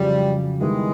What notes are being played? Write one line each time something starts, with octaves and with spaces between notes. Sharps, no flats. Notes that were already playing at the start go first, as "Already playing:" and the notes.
Already playing: F2 C#3 F#3 G3
D#3 G3 G#3 B3 E4 G4